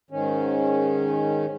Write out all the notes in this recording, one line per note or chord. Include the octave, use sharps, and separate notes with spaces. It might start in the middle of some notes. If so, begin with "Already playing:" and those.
G#2 D#3 C#4